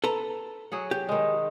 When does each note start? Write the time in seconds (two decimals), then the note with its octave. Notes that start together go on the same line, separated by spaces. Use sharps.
0.04 A4 B4 A#5
0.72 F#3 G#4 F#5
0.91 G4
1.09 D#3 G#3